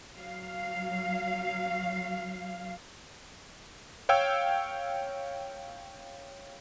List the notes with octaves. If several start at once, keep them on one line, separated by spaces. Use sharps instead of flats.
F#3 F5
C#5 F5 G5 E6 G#6